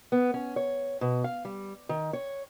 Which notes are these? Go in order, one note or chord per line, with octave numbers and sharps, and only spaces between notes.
B3
C#4
C#5
B2
F5
G3
D#3
C#5